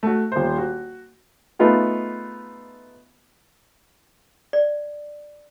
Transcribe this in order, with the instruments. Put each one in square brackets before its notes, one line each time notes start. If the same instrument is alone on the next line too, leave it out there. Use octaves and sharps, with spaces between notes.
[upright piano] A3 F#4
D#1 C5
F#4
[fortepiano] A3 B3 D#4 F4 G#4
[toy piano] D5